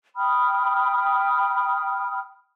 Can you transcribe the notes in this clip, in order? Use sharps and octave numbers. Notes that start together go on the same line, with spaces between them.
G5 B5 D#6 F6